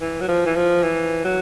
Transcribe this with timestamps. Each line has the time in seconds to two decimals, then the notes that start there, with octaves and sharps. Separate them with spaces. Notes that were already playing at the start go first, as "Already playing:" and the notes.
0.01 E3
0.21 F#3
0.28 F3
0.46 E3
0.56 F3
0.83 E3
1.24 F#3